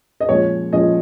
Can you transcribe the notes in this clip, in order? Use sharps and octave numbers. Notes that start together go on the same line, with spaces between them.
D#5
A#2 F3 G#3 C#4 C#5
A#2 F3 G#3 C#4 D#5